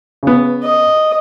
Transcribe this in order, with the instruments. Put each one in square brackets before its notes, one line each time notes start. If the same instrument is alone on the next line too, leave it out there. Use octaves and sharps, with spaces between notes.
[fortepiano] C#3 B3
[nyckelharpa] D#5